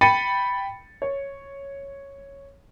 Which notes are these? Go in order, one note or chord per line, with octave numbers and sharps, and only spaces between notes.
G5 B5 A6 C#7 D#7
C#5